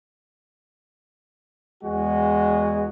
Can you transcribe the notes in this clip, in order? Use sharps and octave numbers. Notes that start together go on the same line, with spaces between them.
E2 G#3 F#4